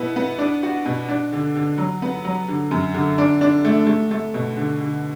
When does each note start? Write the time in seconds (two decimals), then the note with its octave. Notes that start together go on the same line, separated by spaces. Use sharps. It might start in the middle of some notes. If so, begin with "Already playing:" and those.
Already playing: B2 B3 E4
0.16 B3
0.38 D4
0.63 F#4
0.85 B2
1.08 D4
1.32 D3
1.56 D3
1.78 F#3
2.02 B3
2.24 F#3
2.48 D3
2.71 F#2
2.94 D3
3.18 D4
3.41 D4
3.65 A3
3.87 A3
4.11 A3
4.34 B2
4.57 D3
4.80 D3